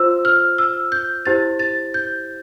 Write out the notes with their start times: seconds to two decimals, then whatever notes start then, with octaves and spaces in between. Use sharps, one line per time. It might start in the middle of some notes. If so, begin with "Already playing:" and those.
Already playing: F4 C5 E6
0.25 F6
0.58 E6
0.92 G6
1.26 E4 G4 C5 A6
1.59 A6
1.94 G6